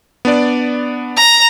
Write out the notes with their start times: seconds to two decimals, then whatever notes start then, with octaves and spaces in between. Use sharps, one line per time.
0.25 B3 D4 D5
1.17 A#5